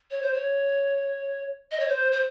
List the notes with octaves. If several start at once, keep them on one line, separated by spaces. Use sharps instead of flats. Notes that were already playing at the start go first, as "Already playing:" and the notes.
C#5
C5
C#5
D#5
C#5
C5
C5